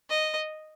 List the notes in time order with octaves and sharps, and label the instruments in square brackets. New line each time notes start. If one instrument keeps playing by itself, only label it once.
[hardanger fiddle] D#5